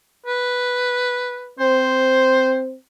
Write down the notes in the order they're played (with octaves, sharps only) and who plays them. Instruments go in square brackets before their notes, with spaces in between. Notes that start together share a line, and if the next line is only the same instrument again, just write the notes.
[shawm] B4
[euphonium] C4 [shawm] C5